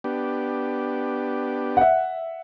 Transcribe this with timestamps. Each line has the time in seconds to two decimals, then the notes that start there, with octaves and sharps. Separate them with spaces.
0.04 B3 D4 G4
1.77 E5 F#5